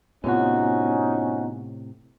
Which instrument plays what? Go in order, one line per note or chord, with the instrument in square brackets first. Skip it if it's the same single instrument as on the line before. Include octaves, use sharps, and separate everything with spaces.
[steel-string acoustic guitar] F#2 F3 F#4 [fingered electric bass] A2 C3 [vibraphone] B3 [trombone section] C#4 D#4